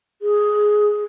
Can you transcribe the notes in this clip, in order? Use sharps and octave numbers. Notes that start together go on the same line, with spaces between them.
G#4